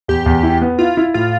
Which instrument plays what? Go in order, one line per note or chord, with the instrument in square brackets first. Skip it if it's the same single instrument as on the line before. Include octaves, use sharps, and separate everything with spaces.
[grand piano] E2 [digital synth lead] G4
[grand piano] E2
E4
B3
[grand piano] E4 [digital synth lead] F4
[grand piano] E4
[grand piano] A2 [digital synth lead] F4